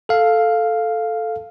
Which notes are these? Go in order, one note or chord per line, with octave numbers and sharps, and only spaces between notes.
A4 F5